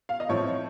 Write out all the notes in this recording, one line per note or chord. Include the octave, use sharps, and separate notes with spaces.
F5
D#5
A2 F3 C4 C#5